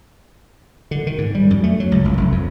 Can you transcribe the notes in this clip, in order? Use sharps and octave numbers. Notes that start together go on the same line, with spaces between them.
D3
D#3
G#2
G3
F#2
A3
F#3
C#2
F#1
F1
F2